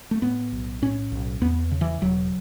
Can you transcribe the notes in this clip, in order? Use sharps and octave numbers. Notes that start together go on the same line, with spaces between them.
A3
A2 B3
B1
A2 C#4
B1
E2 B3
C#3
E3
E1 F#3